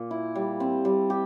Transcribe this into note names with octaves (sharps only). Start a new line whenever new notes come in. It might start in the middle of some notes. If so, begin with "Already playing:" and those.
Already playing: A#2
E4
G3
C4
G3
G4